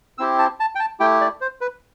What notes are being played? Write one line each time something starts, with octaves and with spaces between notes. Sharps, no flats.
C4 E4 G4 E6
A5
A5
G5
A5
A3 E4 G4 G5
D5
C5
B4